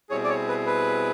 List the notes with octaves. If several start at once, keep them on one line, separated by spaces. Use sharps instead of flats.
B2 G3 C4 E4 G#4 C#5
D5
C#5
B4
B4